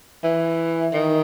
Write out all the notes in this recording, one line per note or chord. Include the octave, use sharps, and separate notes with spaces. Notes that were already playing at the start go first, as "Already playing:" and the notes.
E3
D#3